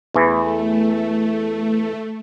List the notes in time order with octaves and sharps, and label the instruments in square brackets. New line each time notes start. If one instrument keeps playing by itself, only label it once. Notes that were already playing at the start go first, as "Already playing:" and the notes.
[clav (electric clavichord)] E2 E3 [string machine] A3